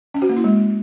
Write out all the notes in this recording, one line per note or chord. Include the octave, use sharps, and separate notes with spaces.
C#4
F#4
A#3
E4
G#3